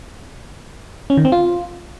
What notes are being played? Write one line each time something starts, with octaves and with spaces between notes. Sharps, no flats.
C#4
D#3
C4
F4